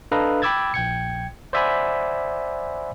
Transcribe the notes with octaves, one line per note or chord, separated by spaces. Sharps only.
D4 A4 B4 D#5 F5 A#5
G5 B5 D6 E6 G#6 A6
A#1 G5 G#6 C#7
C5 D5 E5 F#5 G#5 B5